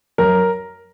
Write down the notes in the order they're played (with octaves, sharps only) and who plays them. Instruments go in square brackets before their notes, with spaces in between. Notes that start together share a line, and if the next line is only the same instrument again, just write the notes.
[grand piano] F#2 A#4